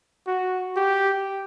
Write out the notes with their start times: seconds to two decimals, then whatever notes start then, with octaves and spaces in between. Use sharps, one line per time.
0.27 F#4
0.76 G4